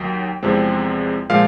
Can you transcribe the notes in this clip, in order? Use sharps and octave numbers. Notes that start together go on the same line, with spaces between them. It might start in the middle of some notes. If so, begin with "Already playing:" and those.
Already playing: D#2 F#3 G5
E2 C3 F3 G#3 C4
A#2 F3 G#3 F5